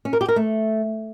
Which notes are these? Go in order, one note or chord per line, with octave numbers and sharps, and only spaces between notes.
C#4
A#4
G4
A#4
A3